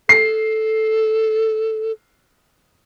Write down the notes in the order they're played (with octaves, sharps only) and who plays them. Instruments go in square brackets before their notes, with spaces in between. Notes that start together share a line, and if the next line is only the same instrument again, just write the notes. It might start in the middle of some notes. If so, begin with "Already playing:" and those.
[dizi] A4 [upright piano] C7